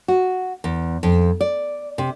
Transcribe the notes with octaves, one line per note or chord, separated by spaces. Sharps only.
F#4
E2
F2
D5
C3